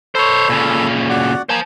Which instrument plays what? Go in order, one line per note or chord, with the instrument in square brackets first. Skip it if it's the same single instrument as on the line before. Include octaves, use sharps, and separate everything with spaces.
[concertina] A4 B5 [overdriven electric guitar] C5 C#5
[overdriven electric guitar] A#2 C#3
[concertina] F#4 D5 F#5
[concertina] A#3 G#5 [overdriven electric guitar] C5 A5